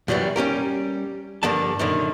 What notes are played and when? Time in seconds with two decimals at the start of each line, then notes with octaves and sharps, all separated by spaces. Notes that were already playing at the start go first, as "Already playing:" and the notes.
0.08 F#2 A#2 E3 F#3 G3
0.36 G3 C#4 G4 A#4
1.43 G2 D3 F3 A#3 A5
1.79 F#2 A#2 D3 D#3